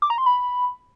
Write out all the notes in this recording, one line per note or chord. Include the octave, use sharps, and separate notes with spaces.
D6
A#5
C6
B5